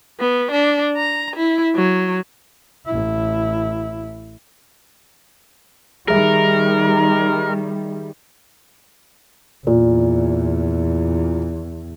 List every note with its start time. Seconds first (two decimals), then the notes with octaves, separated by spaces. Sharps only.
0.20 B3
0.51 D4
0.97 A#5
1.36 E4
1.76 F#3
2.86 A1 E4
6.08 D#3 G3 G#4 A#4 E5
9.67 E2 A#2